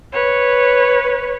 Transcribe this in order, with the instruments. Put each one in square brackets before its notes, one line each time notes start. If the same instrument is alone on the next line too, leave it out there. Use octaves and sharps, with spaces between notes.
[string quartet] B4 C#5